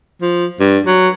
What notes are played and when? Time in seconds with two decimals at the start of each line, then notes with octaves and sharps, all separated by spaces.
0.21 F3
0.60 G2
0.86 F#3